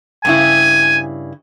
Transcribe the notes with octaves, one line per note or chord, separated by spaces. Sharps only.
G2 C#3 E4 G#5